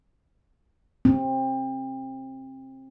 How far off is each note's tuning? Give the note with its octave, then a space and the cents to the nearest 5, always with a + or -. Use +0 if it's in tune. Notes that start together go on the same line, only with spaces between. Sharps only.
C4 +25